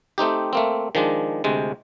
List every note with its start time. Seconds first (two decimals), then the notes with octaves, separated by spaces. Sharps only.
0.18 A3 C4 D#4 G4
0.53 A3 A#3 C4
0.95 D#3 F3 G#3 D4
1.44 D2 C3 G#3